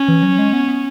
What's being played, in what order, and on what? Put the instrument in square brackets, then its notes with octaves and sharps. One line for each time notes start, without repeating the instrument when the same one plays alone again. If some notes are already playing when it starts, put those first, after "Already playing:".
Already playing: [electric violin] C#4
[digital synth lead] E3
F#3
G#3
B3
B3